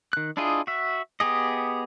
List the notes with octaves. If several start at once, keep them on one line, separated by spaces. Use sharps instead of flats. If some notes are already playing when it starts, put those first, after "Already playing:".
D#3 F#6
D4 E4 F4 G#4 D#5
F#4 E5
B3 G4 G#4 D#5